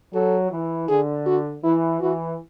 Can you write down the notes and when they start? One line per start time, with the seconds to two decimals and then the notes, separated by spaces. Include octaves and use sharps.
0.14 F#3 A4
0.51 E3
0.89 D3 G#4
1.26 F#4
1.63 E3 E4
2.01 E3 F#4